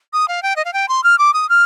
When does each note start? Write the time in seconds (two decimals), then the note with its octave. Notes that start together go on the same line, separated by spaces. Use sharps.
0.13 D#6
0.28 F5
0.43 G5
0.56 D#5
0.65 F5
0.73 G5
0.89 C6
1.04 F6
1.18 D6
1.34 D#6
1.49 F6